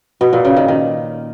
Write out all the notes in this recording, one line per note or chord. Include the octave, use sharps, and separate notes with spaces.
B2
A#2
C#3
D#3
D#3